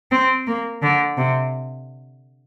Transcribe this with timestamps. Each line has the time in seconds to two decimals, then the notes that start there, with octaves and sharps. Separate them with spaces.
0.11 C4
0.47 A#3
0.82 D3
1.17 C3